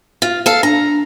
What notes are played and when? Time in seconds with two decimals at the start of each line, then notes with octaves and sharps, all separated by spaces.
0.22 F4
0.46 A4 F5
0.63 D4 A#5